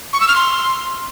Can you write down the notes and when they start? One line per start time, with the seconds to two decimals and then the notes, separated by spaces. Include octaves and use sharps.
0.13 C#6
0.21 E6
0.28 F6
0.36 C6